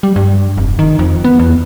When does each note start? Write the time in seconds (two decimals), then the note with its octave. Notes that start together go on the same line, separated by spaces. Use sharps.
0.03 G3
0.16 G2
0.57 F1
0.79 D#3
0.99 F2
1.24 B3
1.39 E2